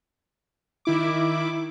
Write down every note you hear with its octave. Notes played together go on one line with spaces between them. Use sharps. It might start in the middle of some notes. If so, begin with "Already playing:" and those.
D#3 E4 D6